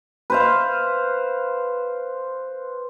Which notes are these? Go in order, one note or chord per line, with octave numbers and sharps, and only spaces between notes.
B4 C5 F5